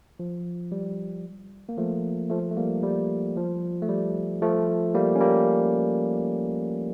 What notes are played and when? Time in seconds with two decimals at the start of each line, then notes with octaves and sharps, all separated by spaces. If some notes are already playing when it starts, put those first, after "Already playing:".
0.19 F3
0.72 G3
1.69 A#3
1.78 F3 A3
2.30 F3 A3
2.51 A3
2.57 G3 A#3
2.83 G3
3.37 F3
3.82 A3
3.89 G3
4.42 F3 A3
4.95 G3 A#3
5.15 C#4
5.20 G3 A#3